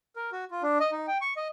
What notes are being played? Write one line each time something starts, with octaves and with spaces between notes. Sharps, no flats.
A#4
F#4
F4
D4
D#5
D#4
G5
C#6
D#5